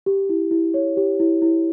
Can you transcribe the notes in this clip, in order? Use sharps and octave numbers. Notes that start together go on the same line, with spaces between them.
G4
E4
E4
C#5
G4
E4
E4